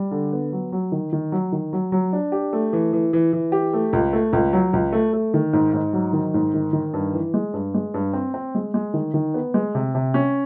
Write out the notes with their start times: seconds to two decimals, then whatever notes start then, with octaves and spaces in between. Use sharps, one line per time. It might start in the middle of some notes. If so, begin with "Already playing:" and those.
Already playing: G3
0.11 D3
0.32 B3
0.52 F#3
0.72 F#3
0.92 D#3
1.13 D#3
1.32 F#3
1.52 D#3
1.73 F#3
1.92 F#3
2.13 D4
2.32 G4
2.53 A3
2.73 E3
2.93 E3
3.13 E3
3.33 E3
3.52 G4
3.73 A3
3.93 C#2
4.13 A3
4.33 C#2
4.53 F#3
4.73 C#2
4.93 A3
5.13 A3
5.34 D#3
5.53 G#2
5.73 G#2
5.93 F#3
6.13 D#3
6.34 G#2
6.54 D#3
6.73 D#3
6.93 G2
7.14 E3
7.34 G#3
7.53 G2
7.74 G#3
7.94 G2
8.13 C4
8.34 C4
8.55 G#3
8.74 G#3
8.94 D#3
9.14 D#3
9.34 B3
9.54 G#3
9.75 C3
9.95 C3
10.14 C#4